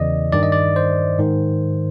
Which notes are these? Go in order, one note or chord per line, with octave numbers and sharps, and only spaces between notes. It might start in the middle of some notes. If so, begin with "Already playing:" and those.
Already playing: E2 C#3 E3 D5 D#5
G2 D#3 D5
D#5
D5
C5
G#2 D#3